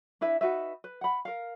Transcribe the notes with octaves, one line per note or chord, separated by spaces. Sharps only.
D4 E4 B4 E5
D#4 F#4 B4 E5
B4
F#5 B5
A#4 F5